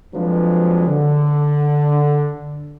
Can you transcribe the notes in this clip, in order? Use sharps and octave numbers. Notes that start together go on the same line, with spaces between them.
F2 F3 F#3 G#3 D4 B4
D3